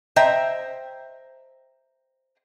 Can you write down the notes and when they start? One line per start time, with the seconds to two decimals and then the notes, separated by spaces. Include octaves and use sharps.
0.16 C5 D#5 E5 G5 A#5